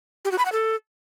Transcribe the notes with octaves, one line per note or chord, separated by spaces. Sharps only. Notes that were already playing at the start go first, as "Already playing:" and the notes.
G4
F#4
B5
F#5
A4